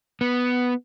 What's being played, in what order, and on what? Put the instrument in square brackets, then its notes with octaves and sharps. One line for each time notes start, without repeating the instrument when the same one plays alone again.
[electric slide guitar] B3